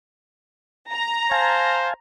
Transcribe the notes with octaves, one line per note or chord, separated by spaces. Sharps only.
A#5
C5 F5 G#5 A5